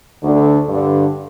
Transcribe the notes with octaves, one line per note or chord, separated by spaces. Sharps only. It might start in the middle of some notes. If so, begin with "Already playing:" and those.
D2 D3
G2 D3